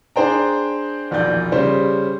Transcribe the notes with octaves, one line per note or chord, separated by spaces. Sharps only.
D4 G#4 C5 G5 A#5
E1 A#1 D#3 D5 G6
C#3 G3 C#4 C5